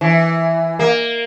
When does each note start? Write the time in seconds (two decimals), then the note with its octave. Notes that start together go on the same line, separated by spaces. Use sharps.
0.01 E3
0.79 A#3